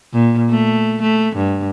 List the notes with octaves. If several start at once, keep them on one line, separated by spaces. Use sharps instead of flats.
A#2
A3
A3
G2